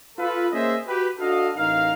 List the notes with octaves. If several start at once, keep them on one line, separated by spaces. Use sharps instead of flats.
F4 A4 B4
A#3 C#4 G#4 C5 D#5 E5
F#4 G4 B4
D4 F#4 A4 D#5 F5
A1 D#4 A#4 F5